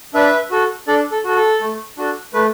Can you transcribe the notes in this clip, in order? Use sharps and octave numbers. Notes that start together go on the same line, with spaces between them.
D4 B4 E5
F#4 A4
D4 A4 D5
A4
F#4 A4
A4
A3
D4 F#4 A4
A3 B4